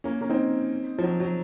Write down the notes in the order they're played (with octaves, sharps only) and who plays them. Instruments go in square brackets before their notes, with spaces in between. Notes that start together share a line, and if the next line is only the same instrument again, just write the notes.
[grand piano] A#3 C#4
A#3 C#4
C4 D#4
F3
F#3
F#3